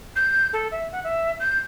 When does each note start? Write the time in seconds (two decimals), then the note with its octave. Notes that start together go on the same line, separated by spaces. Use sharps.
0.16 G6
0.53 A4
0.71 E5
0.92 F#5
1.04 E5
1.40 G6